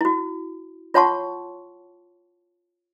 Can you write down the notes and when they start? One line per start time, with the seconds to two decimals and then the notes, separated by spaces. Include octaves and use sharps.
0.01 E4 F#4
0.94 F4 C#5 F#5 A5 C6 C#6